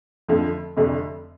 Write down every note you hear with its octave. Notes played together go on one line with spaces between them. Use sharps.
F2 D3 F3 A3
F1 F2 D3 A3 D4